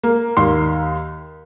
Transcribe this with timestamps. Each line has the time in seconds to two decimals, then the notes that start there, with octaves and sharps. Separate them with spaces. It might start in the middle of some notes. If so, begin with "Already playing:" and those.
0.04 A#3
0.37 D#2 C6